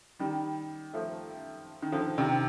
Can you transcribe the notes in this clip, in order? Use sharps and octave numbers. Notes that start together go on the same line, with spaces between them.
D#3 G3
F3 A3
D#3
D3 F3
C3 D#3